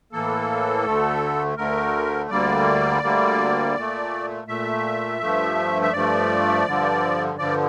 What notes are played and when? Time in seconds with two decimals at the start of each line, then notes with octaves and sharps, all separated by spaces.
0.12 A2 E3 A#3 A4
0.85 D2 D3 A3
1.57 D2 D3 A3 A#4
2.30 D2 D3 G3 A#3 D5
3.03 D2 D3 G3 A#3
3.75 A#2 A3
4.47 A#2 A3 E5
5.21 G2 F3 A3
5.82 E5
5.93 G2 F3 A3 D5
6.66 G2 D3 F3
7.38 G2 D3 F3 D5